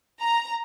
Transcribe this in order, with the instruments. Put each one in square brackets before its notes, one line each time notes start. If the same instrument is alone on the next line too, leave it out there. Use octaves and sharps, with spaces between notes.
[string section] A#5